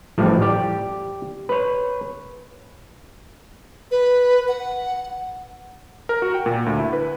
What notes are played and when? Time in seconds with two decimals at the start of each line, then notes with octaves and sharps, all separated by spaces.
0.18 A1 A2 F3 G3 D5
0.42 G4 D5
1.49 B4 C#5
3.91 B4
4.48 F#5
6.09 A#4
6.22 F#4
6.34 G5
6.46 A#2
6.66 D2
6.79 E4
6.93 B4